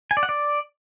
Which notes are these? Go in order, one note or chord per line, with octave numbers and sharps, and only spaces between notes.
G#5
D5
F#5
D5